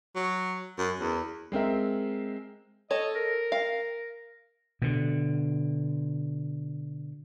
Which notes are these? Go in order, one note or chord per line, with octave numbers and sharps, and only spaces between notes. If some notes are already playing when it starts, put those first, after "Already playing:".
F#3
F#2
E2
G#3 C4 A#4 E5
A4 C#5 D#5
A#4
F5
B2 D3